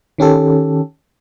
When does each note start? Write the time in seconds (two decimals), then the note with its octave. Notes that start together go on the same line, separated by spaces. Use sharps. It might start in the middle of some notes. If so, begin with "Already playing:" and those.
0.18 D#3 C#4 G4 A4